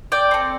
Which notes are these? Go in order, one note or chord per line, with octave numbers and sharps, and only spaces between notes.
D5 G5
C4 A4